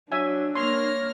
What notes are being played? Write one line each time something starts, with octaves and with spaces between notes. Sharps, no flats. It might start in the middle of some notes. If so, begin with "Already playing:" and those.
F#3 D4 E5 G#5
A#3 C#5 C6 F6 A#6